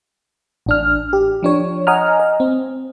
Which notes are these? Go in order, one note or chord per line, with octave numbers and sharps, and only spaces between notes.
A1 D4 F6
G4
F3 D4 C#5
D#5 F#5 G#5 A#5 F6
D#5
C4